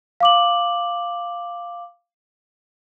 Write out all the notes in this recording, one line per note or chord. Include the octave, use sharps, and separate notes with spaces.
F5 D6 F#7